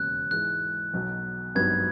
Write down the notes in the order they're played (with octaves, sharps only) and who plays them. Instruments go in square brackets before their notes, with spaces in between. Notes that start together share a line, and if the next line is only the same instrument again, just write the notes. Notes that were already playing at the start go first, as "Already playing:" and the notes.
Already playing: [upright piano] E1 D#2 C#3 [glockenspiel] F#6
[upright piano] G#2 E3 G#3 [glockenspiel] F#6
[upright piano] B1 B2 F#3
[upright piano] G#1 G2 D#3 F#3 B3 [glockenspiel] G#6